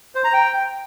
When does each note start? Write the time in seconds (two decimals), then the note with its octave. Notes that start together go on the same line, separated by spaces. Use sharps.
0.15 C5
0.24 A#5
0.34 G5